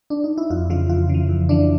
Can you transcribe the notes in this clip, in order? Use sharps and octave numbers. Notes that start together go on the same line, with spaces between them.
D4
D#4
E4
F2 F4
C#3 E3 F4
F2 F4
C#3 E3
F2
C#3 E3 D4